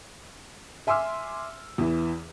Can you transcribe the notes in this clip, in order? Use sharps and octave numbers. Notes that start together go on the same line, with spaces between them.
E5 G#5 C6 D6 E6 F6
E2 E3